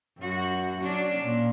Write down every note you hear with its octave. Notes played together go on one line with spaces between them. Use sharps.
F#2 F#4
F#3 C#4 D4
A#2